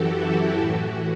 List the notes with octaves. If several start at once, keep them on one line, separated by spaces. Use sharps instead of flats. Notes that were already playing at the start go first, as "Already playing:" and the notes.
Already playing: F#2 E3 F#4 G4 A4
E4
A2 E3 F#4